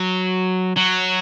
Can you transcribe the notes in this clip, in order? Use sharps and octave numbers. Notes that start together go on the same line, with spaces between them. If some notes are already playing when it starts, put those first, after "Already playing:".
Already playing: F#3
F#3